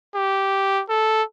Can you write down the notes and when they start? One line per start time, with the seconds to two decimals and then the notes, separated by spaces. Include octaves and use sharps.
0.15 G4
0.89 A4